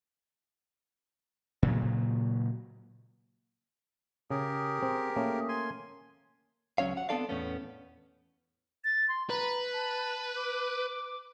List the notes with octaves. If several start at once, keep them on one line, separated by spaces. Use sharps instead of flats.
A#2 C#3 F#3
C#3 G4 G#4 A#4
C4
A3 A#3 C#4
G#5 C6
C#2 F#3 C#4 C#5 F5
F#5
B3 C4 D4 A4 D5 F5
E2 A2 A3 B3 C#4
A6
C6
B4 A#5
A5
D6